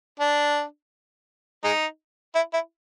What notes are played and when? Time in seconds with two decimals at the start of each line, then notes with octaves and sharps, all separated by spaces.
0.20 D4
1.64 G#3 D#4
2.35 E4
2.53 E4